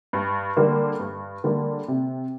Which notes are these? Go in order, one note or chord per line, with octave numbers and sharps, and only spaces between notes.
G2
D3 G3 A#3
G2
D3 G3 A#3
C3